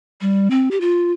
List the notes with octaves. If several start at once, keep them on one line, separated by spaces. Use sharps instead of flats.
G3
C4
G4
F4